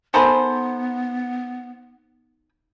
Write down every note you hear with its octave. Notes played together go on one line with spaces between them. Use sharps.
B3 D#4 A4 A#4 C5 G#5 B5